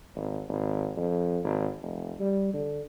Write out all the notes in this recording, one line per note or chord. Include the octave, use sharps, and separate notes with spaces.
G#1
G#1
F2
G#1
F1
G3
D3